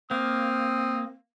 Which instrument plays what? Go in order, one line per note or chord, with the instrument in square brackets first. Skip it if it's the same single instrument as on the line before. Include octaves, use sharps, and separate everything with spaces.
[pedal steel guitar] A#3 [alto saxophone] C4 [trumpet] D#6